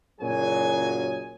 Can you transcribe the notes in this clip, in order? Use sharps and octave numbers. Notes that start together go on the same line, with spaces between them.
F#1 A#2 F#3 G#4 C#5 G#5